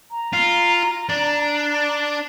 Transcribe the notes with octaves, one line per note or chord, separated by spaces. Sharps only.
A#5
F4
D4